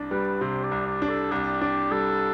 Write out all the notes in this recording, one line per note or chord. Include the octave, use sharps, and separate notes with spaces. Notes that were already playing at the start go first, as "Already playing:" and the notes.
Already playing: C2 D4
G3 B4
C3 C5
D5
C2
D5
D4
A4
C2 G4
D4 G4
G3 A4